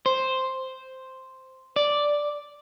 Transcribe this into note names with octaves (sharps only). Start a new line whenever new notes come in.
C5
D5